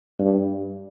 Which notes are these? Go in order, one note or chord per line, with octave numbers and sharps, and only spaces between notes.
G2